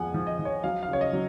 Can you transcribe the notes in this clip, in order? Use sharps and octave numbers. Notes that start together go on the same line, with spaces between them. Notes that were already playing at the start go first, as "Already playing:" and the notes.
Already playing: F2 F3 G#3 B3 F#5 G#5
F3
D#5
F3
C#5
F#3 F5
F5
C#3 C#5
D#5
F#3